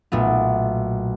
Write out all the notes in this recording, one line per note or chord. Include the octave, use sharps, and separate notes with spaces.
B1 A#2 A3 B3